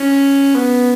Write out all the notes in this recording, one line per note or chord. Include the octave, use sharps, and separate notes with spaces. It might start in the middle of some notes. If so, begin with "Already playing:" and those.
Already playing: C#4
B3